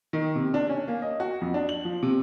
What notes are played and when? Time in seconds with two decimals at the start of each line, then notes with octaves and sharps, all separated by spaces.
0.13 D#3
0.35 C3
0.54 D4
0.69 C#4
0.88 A#3
1.02 D#5
1.20 F#4
1.41 F2
1.54 D4
1.69 F#7
1.85 F3
2.03 C3